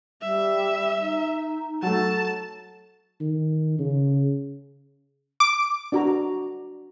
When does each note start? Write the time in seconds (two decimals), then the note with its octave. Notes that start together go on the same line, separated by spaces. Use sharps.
0.22 G3 E5
1.01 D#4
1.83 F#3 A3 A5
3.20 D#3
3.78 C#3
5.40 D6
5.92 D4 F#4 A#5